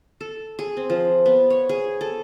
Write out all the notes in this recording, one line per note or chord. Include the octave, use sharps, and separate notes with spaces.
A4
G#4
C4
F3
B3
C#5
G#4
A4